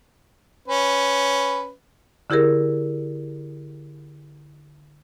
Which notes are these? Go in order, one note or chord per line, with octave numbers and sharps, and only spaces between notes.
C#4 B4
D3 E4 G4 G#4 A#4